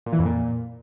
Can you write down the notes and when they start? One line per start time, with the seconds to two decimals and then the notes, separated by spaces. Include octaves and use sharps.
0.06 A#2
0.13 E3
0.19 F2
0.25 A#2